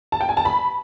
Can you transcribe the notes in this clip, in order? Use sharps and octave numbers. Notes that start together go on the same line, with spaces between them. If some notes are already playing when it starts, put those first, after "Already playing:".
A5
G5
G#5
A5
B5